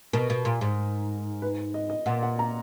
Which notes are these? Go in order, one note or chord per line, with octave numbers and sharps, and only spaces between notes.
B2 A#4
B2
A#2
G#2
B4
D#5
D#5
A#2 F#5
F#5
A#5